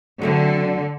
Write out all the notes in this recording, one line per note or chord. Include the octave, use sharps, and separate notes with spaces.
D3 F#3 A3 C4